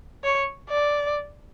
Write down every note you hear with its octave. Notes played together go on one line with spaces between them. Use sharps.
C#5
D5